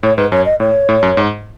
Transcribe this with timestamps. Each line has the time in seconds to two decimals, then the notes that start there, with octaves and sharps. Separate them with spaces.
0.03 A2 C#5
0.17 G#2 B4
0.32 F#2 C#5
0.45 D#5
0.60 A2 C#5
0.89 A2
1.03 F#2
1.17 G#2